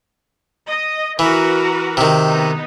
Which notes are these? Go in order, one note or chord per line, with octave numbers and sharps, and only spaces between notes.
D#5
E3 F#4 A#4 B4
C3 D#3
B3 D#4